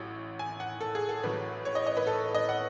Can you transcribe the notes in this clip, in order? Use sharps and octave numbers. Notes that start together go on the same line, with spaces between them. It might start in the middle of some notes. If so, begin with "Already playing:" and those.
Already playing: A1 A2 F#3
G#5
F#5
A4
G#4
A4
A1 A2 F#3 B4
C#5
D#5
D#5
B4
A4
D#5
F#5